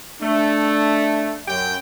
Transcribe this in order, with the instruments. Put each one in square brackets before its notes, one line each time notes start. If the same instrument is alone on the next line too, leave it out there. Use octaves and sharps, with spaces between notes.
[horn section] A3 [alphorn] D4
[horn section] F#2 G5